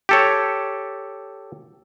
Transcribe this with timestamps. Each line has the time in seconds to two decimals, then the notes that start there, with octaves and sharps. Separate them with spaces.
0.09 G4 A4 C#5